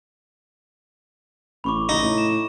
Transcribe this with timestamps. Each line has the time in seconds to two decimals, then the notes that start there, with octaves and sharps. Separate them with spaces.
1.64 A1 B5 C#6 D6
1.89 D#4
2.02 A2
2.18 E7